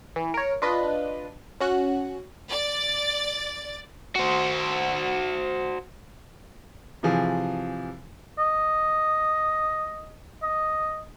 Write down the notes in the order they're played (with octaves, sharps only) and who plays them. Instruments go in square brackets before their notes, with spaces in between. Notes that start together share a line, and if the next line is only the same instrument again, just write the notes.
[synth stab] E3
A#4 C#5
D4 F4 B4 D#5
C#4 F#4 F#6
[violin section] D5 A6
[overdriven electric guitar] F#4 C5
[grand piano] C3 E3 F3 G#4
[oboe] D#5
D#5